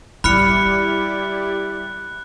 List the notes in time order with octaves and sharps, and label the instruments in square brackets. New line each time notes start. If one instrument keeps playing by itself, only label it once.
[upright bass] G3 [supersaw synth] E4 G4 D5 [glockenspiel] B5 F6 C#7 [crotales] F#6